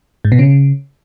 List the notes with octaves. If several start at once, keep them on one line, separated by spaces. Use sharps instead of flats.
G#2
B2
C#3